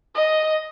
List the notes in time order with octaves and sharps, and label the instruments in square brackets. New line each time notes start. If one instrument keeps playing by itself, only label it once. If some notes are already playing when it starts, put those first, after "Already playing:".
[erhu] D#5